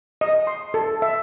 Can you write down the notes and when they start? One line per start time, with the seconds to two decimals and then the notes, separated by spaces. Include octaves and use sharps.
0.21 D#5
0.47 C6
0.74 A4
1.02 E5